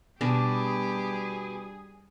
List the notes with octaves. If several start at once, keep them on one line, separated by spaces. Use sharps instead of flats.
B2 G3 D4 G4 G#4